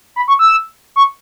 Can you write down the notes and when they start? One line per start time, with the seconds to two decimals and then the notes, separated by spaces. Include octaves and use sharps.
0.16 B5
0.28 C#6
0.39 E6
0.96 C#6